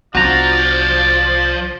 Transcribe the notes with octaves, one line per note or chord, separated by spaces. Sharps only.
C2 F3 B3 D4 F#4 D5 A#5